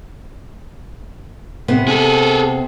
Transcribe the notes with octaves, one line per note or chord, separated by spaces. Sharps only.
C3 B3
G#4 A4